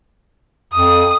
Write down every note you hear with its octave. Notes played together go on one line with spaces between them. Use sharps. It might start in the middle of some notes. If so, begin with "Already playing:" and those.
F2 D#6